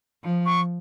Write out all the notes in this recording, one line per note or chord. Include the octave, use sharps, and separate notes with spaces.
F3
C#6